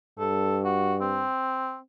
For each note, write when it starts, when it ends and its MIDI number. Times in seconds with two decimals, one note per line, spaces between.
0.19 1.26 43
0.19 0.59 69
0.65 0.95 66
1.01 1.78 60